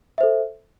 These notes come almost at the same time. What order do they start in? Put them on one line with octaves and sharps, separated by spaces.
E5 C5 A4